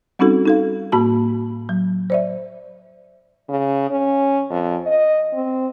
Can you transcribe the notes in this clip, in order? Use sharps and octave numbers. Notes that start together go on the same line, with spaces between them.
G3 C4 C#4 D#4 F#4 A4
D#4 A4 F5
A2 A#3 F#4 A5
F#3
C5 D5 E5
C#3
C#4
F2
D#5
C4